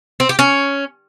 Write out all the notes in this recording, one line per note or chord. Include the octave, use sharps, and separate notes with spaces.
C4
G4
C#4